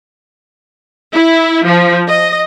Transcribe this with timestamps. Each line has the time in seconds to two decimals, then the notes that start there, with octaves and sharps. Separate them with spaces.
1.14 E4
1.65 F3
2.08 D#5